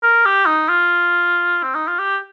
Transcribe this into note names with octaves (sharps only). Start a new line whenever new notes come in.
A#4
G4
D#4
F4
C4
D#4
F4
G4